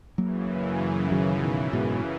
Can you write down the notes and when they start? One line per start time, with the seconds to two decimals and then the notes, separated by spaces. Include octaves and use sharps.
0.18 F#2 C#3 E3 F#3 A#3
1.12 D#3 F#3
1.42 B2 D#3
1.73 G#2 B2